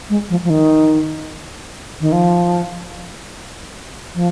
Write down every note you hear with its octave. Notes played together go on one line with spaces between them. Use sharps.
G#3
F3
F3
D#3
D#3
F3
F3